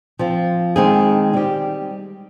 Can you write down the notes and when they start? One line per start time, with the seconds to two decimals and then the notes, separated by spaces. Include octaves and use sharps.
0.19 F3 C4 F4
0.76 D#3 G#3 C4 D#4 G#4
1.33 G3 C4 G4